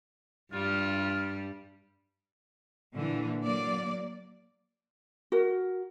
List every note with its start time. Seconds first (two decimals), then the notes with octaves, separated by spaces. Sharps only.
0.53 G2 G3 F4
2.93 A#2 D3 E3
3.43 F#3 A#3 D5
5.32 F#4 A#4